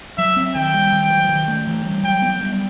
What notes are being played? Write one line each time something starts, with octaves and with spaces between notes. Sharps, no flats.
F#3 E5
C4
D#3 G5
G3
D#3
F#3
D#3
A3
E3
G3
F#3 G5
B3
G3